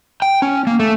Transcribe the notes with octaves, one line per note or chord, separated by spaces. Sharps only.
G5
C#4
A#3
A3